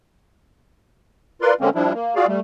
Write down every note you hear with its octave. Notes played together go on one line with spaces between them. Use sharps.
F4 A#4 B4 D5 C6
D3 G#3 A#3 C4 C#4
F3 G3 D4 E4
A#3
F4 F#4 G#4 D5 F5
G3 A3